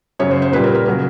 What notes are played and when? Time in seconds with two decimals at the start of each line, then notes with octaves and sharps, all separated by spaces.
0.19 F#2 C#3 F#3 C#5
0.31 C5
0.42 C5
0.52 A#2 G3 B4
0.64 A#4
0.75 A#4
0.86 C#3 F#3 A#4